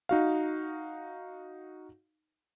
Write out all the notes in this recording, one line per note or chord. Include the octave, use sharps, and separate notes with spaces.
D#4 F#4 F5